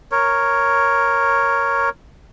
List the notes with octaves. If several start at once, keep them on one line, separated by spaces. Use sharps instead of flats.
A#4 C#5